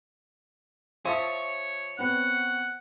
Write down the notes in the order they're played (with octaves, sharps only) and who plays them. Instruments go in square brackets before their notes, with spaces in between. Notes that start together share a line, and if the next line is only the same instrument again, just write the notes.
[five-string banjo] F3 E5 A5 [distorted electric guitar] C#5 [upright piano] D#6 A#6 D#7
[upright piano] B3 C4 B4 [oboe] F#5